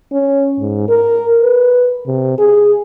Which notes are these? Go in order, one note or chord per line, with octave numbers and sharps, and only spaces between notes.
C#4
G#2
A#4
B4
C3
G#4